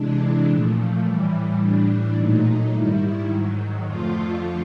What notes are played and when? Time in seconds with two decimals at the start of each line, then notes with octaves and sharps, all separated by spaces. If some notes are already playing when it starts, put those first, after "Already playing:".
Already playing: C3 E3 G#3 D4
0.49 A#2 F3 A3
1.05 A2 E3 G3
1.61 A2 E3 G3 D4
2.17 A#2 F#3 A3 D#4
2.73 G#2 D#3 G3 E4
3.29 G#2 D#3 F#3
3.86 F2 D3 F3 A3 F4